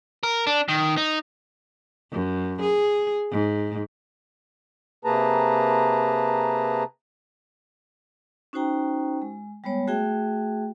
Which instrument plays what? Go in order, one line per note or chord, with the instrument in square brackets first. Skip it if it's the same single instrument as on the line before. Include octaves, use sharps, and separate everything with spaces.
[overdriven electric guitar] A#4
D4
D#3
D#4
[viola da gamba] F#2
G#4
G#2
[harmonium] C3 A#3 G#4 B4 A5 A#5
[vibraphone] C#4 D#4 F#4 C5 G5 A#5
G#3
G3 G#3 B3 C#5
A3 F#4 G#4 E5 G5